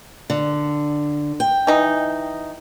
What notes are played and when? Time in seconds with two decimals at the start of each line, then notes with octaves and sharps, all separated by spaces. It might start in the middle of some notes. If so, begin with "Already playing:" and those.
0.30 D3
1.40 G5
1.67 E3 D#4